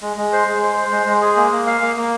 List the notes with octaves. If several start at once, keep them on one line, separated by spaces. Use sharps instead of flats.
G#3
G#3
C5
G#3
C5
C5
G#3
G#3
G#4
A#3
A#3
F5
A#3
A#3